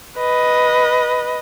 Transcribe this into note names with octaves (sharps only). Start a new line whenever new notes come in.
B4 D#5